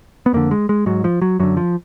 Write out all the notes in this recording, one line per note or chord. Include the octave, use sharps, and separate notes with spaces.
B3
F2 D3 A#3
G#3
G#3
G#2 F#3
F3
F#3
F#2 D3 F#3
F3